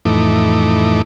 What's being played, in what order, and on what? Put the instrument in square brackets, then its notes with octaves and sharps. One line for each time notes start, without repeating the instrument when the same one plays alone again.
[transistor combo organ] F2 A2 E3 A3 D#4 D6